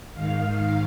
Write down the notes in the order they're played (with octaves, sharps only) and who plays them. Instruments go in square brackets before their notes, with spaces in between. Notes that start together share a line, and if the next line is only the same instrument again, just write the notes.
[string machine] G#2 D#3 F5